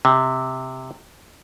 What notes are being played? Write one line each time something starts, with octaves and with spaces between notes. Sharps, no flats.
C3